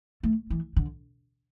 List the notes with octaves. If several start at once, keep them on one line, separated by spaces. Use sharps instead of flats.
A3
E3
D3